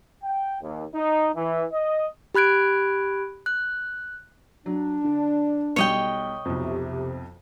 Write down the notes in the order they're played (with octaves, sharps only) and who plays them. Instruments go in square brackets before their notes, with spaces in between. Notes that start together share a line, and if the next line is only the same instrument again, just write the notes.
[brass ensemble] G5
D#2
D#4
E3
D#5
[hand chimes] G4 B5 F#6 G#6 D7
F#6
[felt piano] F#3 [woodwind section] D4
[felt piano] D3
[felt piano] B1 G3 [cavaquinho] C#5 D#5 G5
[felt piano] B1 F2 [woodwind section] C3